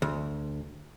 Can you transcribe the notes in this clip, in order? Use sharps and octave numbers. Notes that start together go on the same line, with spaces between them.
D2